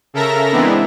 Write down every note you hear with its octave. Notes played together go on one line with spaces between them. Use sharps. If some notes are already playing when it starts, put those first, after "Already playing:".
C#3 A4 A#4 E5 A#5 A#6
E3 G#3 B3 C4 D4 E4